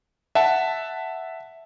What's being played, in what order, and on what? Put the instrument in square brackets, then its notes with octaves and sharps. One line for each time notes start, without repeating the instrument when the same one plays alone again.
[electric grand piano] E5 F#5 A5